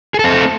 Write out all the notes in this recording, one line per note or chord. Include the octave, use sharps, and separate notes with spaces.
A3 C4 G#4 A4